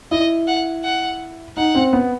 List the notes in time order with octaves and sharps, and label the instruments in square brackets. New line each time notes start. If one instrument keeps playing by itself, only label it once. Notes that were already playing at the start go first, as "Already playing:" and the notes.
[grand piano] E4 [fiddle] D#5
[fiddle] F#5
F#5
[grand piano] D#4 [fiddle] F#5
[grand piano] C4
B3